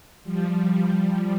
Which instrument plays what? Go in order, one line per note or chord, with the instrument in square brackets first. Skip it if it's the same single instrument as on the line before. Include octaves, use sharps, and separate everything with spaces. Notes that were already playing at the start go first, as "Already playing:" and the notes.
[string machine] F3 G3